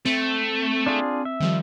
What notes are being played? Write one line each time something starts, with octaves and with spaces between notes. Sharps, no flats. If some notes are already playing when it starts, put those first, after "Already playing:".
A3 C4
D4 F4 G#4
E5
D#3 F3 G3